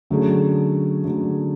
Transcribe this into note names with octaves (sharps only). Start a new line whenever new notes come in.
D3 F#3 A3 C#4 G#4
D3 F#3 A3 C#4 G#4